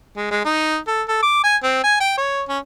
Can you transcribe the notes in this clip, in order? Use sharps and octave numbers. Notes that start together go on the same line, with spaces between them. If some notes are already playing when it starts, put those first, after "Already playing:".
G#3
G#3
D#4
A4
A4
D6
G#5
C4
G#5
G5
C#5
C#4